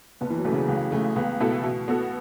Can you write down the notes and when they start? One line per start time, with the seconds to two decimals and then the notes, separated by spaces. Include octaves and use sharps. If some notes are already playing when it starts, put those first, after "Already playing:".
0.21 F#1 B3
0.30 E3
0.37 F#3
0.44 E2 B2 A3 C#4
0.53 C#3
0.68 C#2 A3
0.92 C#3 E3 A3
1.16 C#2 B3
1.40 B2 A3 E4 A4
1.63 B2
1.88 B3 F#4 A4